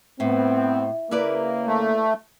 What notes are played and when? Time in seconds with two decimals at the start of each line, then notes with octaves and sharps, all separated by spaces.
0.20 A2 B3 C4
1.11 C#3 A#3 E4 B4 D5
1.66 A3